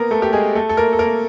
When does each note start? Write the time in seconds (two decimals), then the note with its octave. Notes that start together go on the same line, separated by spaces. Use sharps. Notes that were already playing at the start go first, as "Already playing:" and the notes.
Already playing: A#3 B3 A#4
0.11 A3 A4
0.22 G4
0.33 G#3 G#4
0.55 A3 A4
0.69 A4
0.77 A#3 A#4
0.93 A4
0.99 A#3 A#4